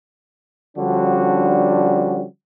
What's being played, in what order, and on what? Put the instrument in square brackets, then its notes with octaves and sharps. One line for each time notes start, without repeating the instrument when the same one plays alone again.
[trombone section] D3 F3 G3 C#4 D4 F#4